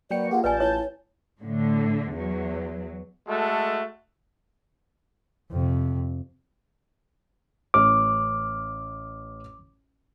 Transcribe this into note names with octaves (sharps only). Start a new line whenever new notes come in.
F#3 A#3 F#4 B4 D5 G5 C#7
A#3 F4 G4 G#4 F#5
A1 B4 D5 G#5 A5 G6
E4 C#5
A2 D3
E2 F#3
G#3 A3 F#4 A4
F2 C3
A1 C#5 D6 F6